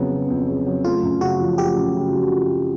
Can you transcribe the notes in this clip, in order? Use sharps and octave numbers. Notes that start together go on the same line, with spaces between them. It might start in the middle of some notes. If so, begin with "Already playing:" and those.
Already playing: F2 C#3 F#3 B3
B3
F2
C#3
F#3
A3 F4
F#2
C#3 F#4
F3
A3 G4
F#2
C#3
F3